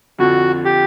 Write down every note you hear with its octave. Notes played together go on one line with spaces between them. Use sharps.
F2 D3 F3 F#4
G4